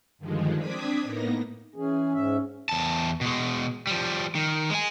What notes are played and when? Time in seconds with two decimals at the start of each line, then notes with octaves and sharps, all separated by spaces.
0.18 G2 D3 D#3 F3 G#3
0.57 C4 D4 D6 D#6 G#6 B6
1.02 A2 A#3 B3 D#4 A#6
1.76 E3 C#4 G#4
2.14 G#2 E5
2.69 E2 A5
3.21 B2 G#3
3.87 F3 G3
4.35 D#3
4.70 G#3 G#5